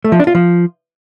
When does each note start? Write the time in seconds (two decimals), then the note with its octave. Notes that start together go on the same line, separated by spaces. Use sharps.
0.04 A3
0.12 F3
0.20 D4
0.27 F4
0.35 F3